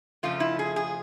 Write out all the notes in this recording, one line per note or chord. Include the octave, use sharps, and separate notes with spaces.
F2 C#3 F3 A3 F4
E4
G#4
G#4